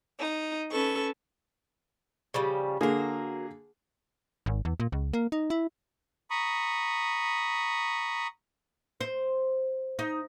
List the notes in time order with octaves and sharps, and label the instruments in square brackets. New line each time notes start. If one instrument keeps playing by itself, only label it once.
[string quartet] D#4
C#4 A4 B4 C#6
[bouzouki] C#3 F3 G3
[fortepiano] D3 A#3 G#4 [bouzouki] F#3 A#4
[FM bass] G#1
E2
A#2
C#2
A#3
D#4
E4
[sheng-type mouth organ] A#5 B5 C#6 D#6
[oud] C5
D#4